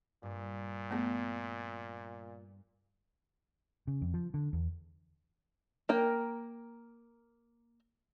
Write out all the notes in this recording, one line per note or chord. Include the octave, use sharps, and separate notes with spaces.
G2 A#2
A3 B3
C#3
F2
F3
D3
E2
A#3 A#4 G5 A#5